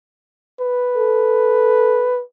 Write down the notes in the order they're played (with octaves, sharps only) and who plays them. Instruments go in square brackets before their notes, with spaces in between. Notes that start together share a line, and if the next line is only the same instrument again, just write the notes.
[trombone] B4
[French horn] A4